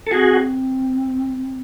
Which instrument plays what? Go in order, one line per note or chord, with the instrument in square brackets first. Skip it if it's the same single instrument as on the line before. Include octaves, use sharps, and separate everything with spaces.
[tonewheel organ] A4
[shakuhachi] C4 [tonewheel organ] F#4 G#4